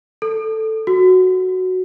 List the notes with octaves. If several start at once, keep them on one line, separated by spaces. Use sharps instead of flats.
A4
F#4